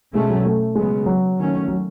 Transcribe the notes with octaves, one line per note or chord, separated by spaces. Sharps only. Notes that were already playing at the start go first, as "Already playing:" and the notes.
B2 G#3 A3 C#4
F#3
A3
C#3 F#3 G#3 B3
F#3
D#3 A3 C#4
F#3